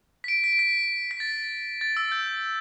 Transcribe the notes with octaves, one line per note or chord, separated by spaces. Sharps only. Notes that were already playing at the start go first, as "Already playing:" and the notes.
B6
D7
B6
D7
B6
B6
A6
A6
E6
G6